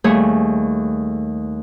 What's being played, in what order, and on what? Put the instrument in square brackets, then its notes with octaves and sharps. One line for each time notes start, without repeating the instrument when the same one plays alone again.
[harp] D#2 G3 A3 G#4 C#5